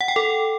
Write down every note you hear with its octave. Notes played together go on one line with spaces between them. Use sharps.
F#5
G5
A4